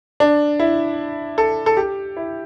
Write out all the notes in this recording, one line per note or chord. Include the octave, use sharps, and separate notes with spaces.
D4
E4
A4
A4
G4
E4